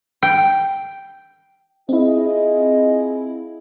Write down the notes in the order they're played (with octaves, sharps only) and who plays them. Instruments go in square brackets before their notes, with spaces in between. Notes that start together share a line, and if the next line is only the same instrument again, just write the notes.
[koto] G5
[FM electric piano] C4 E4 [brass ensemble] F4 G#4 D#5